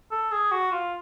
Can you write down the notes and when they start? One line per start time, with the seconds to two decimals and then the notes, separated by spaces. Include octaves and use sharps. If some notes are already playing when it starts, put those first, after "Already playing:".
0.11 A4
0.31 G#4
0.52 F#4
0.72 F4